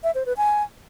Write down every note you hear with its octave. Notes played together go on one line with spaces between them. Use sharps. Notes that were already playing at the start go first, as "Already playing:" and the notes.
E5
C5
B4
G#5